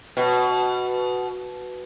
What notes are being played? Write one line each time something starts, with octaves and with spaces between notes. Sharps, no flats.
B2